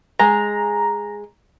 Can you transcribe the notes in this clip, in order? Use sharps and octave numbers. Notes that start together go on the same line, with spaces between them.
G#3 G#4 A#5